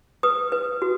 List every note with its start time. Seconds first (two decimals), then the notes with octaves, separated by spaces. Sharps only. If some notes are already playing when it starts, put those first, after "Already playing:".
0.23 B4 D#6
0.52 B4
0.82 F#4